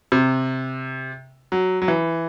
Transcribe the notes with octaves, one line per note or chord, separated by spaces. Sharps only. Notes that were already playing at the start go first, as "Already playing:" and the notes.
C3
F#3
F#3
E3